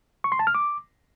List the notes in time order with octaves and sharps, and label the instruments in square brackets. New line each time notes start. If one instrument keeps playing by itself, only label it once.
[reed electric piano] C#6
C6
A5
F6
D6